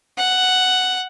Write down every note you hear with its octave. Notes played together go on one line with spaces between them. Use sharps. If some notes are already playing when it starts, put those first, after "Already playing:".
F#5